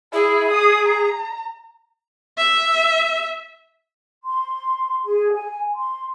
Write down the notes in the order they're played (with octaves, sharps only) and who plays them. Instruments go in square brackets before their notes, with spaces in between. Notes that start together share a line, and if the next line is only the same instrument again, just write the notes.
[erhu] E4 [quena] G#4
[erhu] D#6
A#5
[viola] E5
[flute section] C6
G#4
G#5
C6